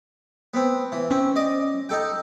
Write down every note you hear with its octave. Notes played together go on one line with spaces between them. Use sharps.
B3 C4
E3
C4 C#4
D5 D#5
D#4 A4 G5